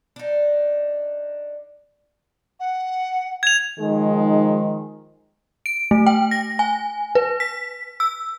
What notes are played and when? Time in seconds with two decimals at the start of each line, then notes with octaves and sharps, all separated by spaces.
0.16 D4 D#4
2.60 F#5
3.43 G#6 F7
3.79 D#3 F3 G#3 D#4 G#4
5.66 D7
5.91 A3
6.07 G5
6.31 A#6
6.59 G#5
7.15 B4
7.40 B6
8.00 E6